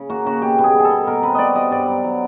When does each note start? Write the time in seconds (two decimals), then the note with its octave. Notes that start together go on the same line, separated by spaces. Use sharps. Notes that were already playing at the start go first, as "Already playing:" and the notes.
Already playing: C#3
0.10 A#3 F#4
0.26 C#3 F#4
0.42 B2 G4
0.59 B2
0.64 G#4
0.74 G3
0.80 G#4 A4
0.91 B2
1.07 B2 A#4
1.23 C4 B4
1.35 B2 D5 D#5
1.55 G3 D#5
1.71 G2 D5
1.88 F#3
2.04 F#3